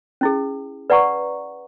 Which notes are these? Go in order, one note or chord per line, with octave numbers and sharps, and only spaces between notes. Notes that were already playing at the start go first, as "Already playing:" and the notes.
C#4 E4 G#4
B4 D5 F#5 A#5 C#6